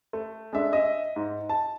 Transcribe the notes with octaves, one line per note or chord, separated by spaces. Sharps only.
A3
G#3 D4 E5
D#5 E5
G#2
A5